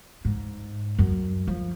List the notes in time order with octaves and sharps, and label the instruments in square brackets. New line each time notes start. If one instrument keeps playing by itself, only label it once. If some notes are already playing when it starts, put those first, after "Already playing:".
[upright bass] G#2
F#2
F3